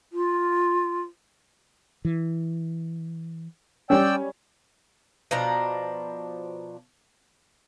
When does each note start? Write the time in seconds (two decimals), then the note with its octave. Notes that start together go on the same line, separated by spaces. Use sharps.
0.13 F4
2.05 E3
3.90 G3 C#4 D5 G5 E6
5.31 B2 F3 D4 A#5